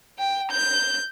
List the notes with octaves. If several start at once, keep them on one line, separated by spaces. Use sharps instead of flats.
G5
G6